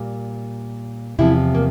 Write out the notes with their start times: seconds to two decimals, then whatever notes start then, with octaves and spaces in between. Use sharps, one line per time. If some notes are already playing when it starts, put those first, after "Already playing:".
Already playing: A#2 G3
1.19 E2 C3 F3 E4
1.55 A#3